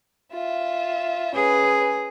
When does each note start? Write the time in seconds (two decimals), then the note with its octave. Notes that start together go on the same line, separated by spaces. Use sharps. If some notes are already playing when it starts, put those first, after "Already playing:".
0.32 F4 E5
1.35 C#4 G#4 B4